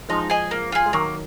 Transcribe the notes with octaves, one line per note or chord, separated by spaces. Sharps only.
F3 G#3 D#4
G#4 D#5 G#5
A#3
F4 G#4
G#3
D#3 F#3 A#3